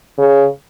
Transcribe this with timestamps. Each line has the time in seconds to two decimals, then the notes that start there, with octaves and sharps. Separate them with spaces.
0.18 C#3